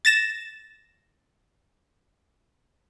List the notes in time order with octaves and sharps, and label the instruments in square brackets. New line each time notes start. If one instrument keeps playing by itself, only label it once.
[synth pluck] A6 A#6 E7